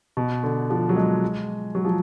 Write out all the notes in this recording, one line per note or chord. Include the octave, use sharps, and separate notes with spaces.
B2
D3
F3
F#3
G#3
F#3
F3